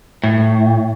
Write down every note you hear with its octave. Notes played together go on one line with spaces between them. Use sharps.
A2